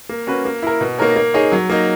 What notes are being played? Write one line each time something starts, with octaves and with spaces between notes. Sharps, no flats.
A#3
C#4 F#4 B4
A#3
E4 A#4
B2
A#3 D#4 A#4 C#5
A#3
D#4 G#4 C#5
F#3
A#3 D#4